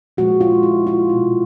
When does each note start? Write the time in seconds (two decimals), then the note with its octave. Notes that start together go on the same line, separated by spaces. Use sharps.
0.17 A#2 F3 G#3 F#4
0.41 F4
0.63 E4
0.87 F4
1.09 B2 G#3 E4